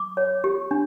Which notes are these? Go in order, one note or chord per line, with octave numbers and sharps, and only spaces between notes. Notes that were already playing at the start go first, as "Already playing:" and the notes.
Already playing: D6
C#5
G4
D4